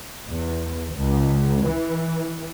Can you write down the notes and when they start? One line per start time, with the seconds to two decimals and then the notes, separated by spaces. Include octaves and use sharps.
0.29 E2
0.96 C#2
1.64 E3